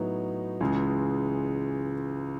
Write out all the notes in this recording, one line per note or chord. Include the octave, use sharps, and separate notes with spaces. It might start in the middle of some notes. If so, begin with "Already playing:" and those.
Already playing: A2 F#3 B3 D#4
C#2 C#3 E3 G#3